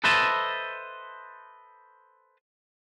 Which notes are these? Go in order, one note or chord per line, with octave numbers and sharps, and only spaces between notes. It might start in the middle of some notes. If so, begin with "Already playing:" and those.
A4 B4 C5 D#5 E5 A5